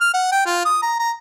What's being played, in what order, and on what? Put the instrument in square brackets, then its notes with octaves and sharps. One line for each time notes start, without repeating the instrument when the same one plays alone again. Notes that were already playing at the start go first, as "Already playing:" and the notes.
[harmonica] F6
F#5
G5
F4
D#6
A#5
A#5